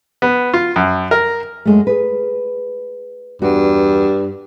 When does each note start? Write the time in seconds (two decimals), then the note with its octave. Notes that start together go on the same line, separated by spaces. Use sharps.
0.22 B3
0.54 F4
0.76 F#2
1.11 A#4
1.65 F#2 G#3 A3
1.87 G#4 B4
3.42 E2 G2 F#4